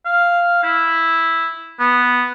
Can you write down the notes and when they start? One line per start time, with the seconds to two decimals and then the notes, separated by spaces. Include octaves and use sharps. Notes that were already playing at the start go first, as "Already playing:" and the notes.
0.05 F5
0.63 E4
1.79 B3